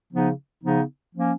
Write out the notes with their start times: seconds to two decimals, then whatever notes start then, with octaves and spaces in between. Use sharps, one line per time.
0.11 C#3 F3 B3 D#4
0.62 C#3 F3 B3 D#4
1.15 F3 A#3 C#4